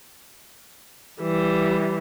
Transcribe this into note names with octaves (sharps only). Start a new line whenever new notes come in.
E3 G3